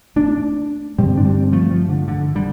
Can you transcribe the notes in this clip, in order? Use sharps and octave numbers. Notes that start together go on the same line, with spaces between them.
A3 D4
G2 D3 G3 C4
D4
G3 C4
F3 A3
F3
D3
D3
D3 G3